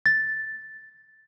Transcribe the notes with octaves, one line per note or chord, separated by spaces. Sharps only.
A6